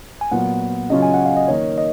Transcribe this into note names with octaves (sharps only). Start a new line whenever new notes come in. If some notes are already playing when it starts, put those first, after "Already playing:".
G#5
A#2 F#3 B3 F4 F#5
C#3 F#3 C#4 F4 D#5
G#5
F#5
F5
D#5
D#3 A#3 D#4 C#5
D#5